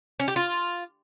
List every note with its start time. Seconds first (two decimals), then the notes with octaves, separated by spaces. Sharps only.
0.20 C#4
0.28 G4
0.36 F4